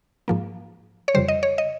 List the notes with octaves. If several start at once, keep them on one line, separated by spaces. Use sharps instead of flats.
G#2 F3 A#3
C#5
F2 C#3 G3 C5
D#5
C#5
D#5